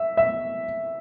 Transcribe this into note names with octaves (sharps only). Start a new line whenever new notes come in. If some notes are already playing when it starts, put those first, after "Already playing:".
Already playing: E5
E5